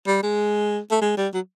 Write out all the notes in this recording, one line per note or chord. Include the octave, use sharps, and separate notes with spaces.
G3
G#3
A3
G#3
G3
F#3